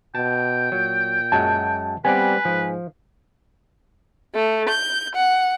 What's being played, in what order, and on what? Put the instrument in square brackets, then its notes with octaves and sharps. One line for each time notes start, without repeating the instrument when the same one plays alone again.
[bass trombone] B2 [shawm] G5 [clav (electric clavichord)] A5
[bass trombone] A#2 [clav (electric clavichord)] F#3
[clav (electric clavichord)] F#2 F#3 G#3 [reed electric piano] A5
[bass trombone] G3 [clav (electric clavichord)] B3 C4 D5 [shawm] B4 [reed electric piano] G#5
[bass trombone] G#2 [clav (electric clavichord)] F3
[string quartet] A3
G6
F#5